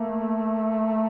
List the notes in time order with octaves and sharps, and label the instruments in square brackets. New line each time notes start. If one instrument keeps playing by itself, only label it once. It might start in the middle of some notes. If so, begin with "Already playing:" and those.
Already playing: [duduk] A3 [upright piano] A#3